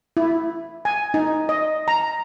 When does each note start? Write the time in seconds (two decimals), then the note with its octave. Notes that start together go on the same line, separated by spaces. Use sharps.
0.17 E4
0.85 G#5
1.14 D#4
1.49 D#5
1.88 A#5